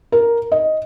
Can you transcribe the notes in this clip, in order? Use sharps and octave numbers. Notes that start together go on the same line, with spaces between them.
A#4
D#5